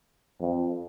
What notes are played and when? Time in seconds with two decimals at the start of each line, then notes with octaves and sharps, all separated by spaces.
0.41 F2